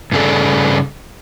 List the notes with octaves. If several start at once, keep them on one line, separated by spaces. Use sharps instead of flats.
G2 C#3 G#4 A4 D5